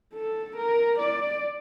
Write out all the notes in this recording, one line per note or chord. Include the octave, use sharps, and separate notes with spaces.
A4
A#4
D5